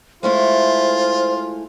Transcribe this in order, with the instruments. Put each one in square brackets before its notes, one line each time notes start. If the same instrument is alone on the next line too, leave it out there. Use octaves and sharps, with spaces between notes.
[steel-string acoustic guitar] G#3 A3 E4 [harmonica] F4 [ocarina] C5